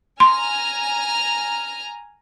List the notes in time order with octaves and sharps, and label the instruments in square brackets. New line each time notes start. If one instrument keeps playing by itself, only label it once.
[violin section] G#5 A#5 F6 [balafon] C6